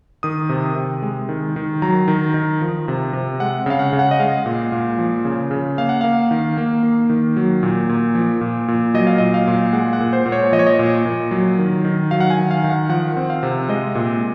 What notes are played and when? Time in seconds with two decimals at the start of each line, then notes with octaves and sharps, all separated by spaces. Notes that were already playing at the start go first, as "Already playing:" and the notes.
0.23 D#3 D#6
0.49 C3
0.76 C3
1.03 G#3
1.29 D#3
1.56 D#3
1.82 F#3 A#5
2.08 D#3
2.34 D#3
2.61 F3
2.88 C3
3.13 C3
3.40 G#3 F#5
3.66 C#3 F5
3.79 F#5
3.93 C#3
3.99 F#5
4.11 D#5
4.20 G#3 F5
4.46 A#2
4.72 A#2
4.99 F3
5.25 C#3
5.51 C#3
5.78 A#3 F5
5.89 F#5
6.01 A#3 F5
6.31 D#3
6.57 A#3
6.83 A#3
7.10 D#3
7.37 F#3
7.63 A#2
7.89 A#2
8.15 F3
8.41 A#2
8.68 A#2
8.94 F#3 D#5
9.07 F5
9.18 A#2 D#5
9.34 F5
9.47 A#2
9.73 G#3 F#5
9.93 F#5
10.00 A#2
10.13 C5
10.26 A#2
10.32 C#5
10.52 F3 D#5
10.59 C#5
10.67 D#5
10.79 A#2
11.05 A#2
11.31 F#3
11.59 D#3
11.85 D#3
12.11 F#3 F5
12.20 F#5
12.30 G#5
12.38 D#3
12.51 F5
12.64 D#3
12.70 F#5
12.89 F3 F#5
13.17 C4
13.30 F5
13.43 C3
13.69 G#3 D#5
13.95 A#2